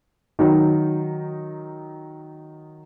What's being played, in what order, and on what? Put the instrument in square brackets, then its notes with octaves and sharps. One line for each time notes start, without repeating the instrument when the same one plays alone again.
[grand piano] D#3 F#3 D#4